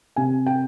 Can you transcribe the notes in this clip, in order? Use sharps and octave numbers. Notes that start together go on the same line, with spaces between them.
C3 G#5
G5